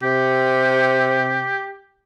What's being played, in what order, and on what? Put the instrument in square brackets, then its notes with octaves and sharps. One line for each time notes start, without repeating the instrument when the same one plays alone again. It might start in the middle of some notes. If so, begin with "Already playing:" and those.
[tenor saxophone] C3 [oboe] G4